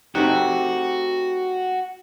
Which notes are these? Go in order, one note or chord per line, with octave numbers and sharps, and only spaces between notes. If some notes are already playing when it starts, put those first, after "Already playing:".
A3 C4 D#4 F#4 G4 F#6